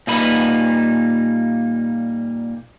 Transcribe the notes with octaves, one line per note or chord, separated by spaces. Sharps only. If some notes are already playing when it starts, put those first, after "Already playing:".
A#2 G3 A#3 D#4 B4 B5